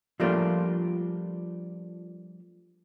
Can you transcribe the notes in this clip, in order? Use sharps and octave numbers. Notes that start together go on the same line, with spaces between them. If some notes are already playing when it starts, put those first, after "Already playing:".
F3 G3 A3 A#3 D4 F4